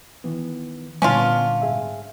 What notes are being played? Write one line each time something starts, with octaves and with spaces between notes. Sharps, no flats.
D#3 E3 B3
A#2 D3 G3 B3 C#4 D4 F4
G#2 G#4 E5